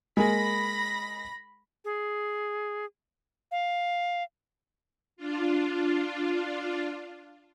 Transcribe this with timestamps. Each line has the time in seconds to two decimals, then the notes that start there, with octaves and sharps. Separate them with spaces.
0.17 G#3 A#3 G#4 B5 A#6
1.85 G#4
3.51 F5
5.17 D4 F4